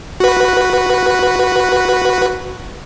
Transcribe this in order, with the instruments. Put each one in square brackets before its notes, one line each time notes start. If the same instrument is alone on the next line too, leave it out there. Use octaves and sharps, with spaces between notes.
[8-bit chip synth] F#4 B4